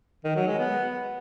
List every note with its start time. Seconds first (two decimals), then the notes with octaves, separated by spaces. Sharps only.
0.25 D#3
0.36 F#3
0.47 G#3
0.59 B3